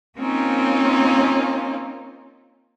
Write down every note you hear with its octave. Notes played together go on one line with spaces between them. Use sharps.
A#3 C4 C#4 D#4 F4